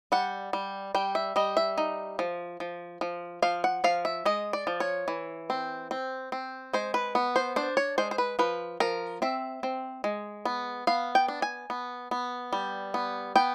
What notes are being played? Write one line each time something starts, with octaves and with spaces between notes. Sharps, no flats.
G3 F#5
G3
G3 G5
E5
G3 D#5
E5
D#4
F3
F3
F3
F3 F5
F#5
F3 F5
E5
G#3 D#5
D5
F3
C#5
E3
C4
C4
C4
G#3 C5
B4
B3
C5
D4 C5
C#5
G#3 C5
C5
B4
F3 B4
F3 A#4
C4 E5
C4
G#3
B3
B3 F5
G5
D4
G#5
B3
B3
G3
B3
B3 G5